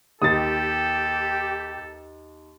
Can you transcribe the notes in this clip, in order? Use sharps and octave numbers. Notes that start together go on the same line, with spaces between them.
D#2 G4 A4 D#6 A6